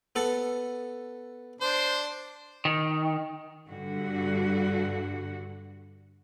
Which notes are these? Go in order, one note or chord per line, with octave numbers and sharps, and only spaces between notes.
B3 A4
D4 C5
D#3
G2 D3 F#4